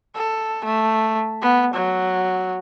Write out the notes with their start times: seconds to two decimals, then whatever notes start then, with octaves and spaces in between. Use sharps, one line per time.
0.15 A4
0.64 A3
1.42 B3
1.74 F#3